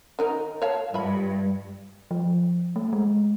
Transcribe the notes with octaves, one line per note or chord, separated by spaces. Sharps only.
D#3 D#4 A#4
C#5 F5 A5
G2 F4 E5 B5
F3
A3
G#3